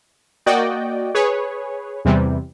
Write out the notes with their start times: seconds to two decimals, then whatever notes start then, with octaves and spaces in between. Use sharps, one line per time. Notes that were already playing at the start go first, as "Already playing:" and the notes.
0.46 A#3 F#4 D5 D#5 G5
1.15 G#4 B4 C#5
2.05 E2 C3 E3 G3